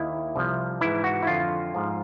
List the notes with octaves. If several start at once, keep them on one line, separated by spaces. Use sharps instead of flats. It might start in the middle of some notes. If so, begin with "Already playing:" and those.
Already playing: D#2 D#3 E4
C2 C3 F3
G#2 E3 E4
F#4
E4
F2 D3 F3 F4
G#2 F3